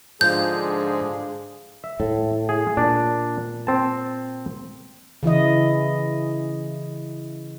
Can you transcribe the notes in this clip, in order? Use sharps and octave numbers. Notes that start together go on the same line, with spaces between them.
G#2 D3 F3 D4 G#4 G6
E5
A2
G#4
A#2 D4
C4 A5
C#3 E3 E4 D#5